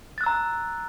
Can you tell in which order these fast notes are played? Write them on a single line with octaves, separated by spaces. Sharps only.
A6 F#6 E6 A#5